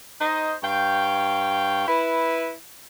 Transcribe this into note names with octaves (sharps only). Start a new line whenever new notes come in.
D#4 C5 D#5
G2 C#5 F5 G5
E4 B4